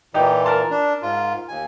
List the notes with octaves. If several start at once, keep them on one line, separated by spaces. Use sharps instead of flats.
A#2 E3 D#4 G4
A#4 A5 C6
D4
G#2 F4
D#2 G#5